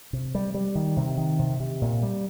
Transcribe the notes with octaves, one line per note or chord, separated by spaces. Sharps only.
C3
G3
G3
D#3
C3
D#3
C3
C3
A#2
G3